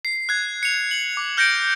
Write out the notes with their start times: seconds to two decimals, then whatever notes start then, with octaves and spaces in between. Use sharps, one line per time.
0.05 C7
0.29 F#6 G#6
0.63 C#7 F7
0.91 F#7
1.17 D6
1.37 F6 G6 A#6 C#7 D7